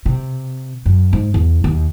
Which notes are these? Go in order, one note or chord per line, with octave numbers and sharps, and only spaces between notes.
C3
F#2
G#2
E2
D#2